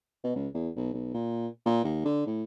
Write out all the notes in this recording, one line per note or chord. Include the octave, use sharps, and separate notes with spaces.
B2
C#2
E2
B1
B1
A#2
A#2
D#2
D3
A2